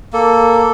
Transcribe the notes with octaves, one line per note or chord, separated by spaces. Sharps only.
A#3 A4